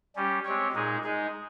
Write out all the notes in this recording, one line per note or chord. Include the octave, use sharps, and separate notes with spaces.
G3 C#4 G4
G#3 C4 G4 C#5
A#2 G#3 D#4 G#4
G#3 D#4 G#4